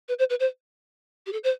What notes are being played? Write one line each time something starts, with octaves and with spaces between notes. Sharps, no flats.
B4
C5
B4
C5
G4
A4
C5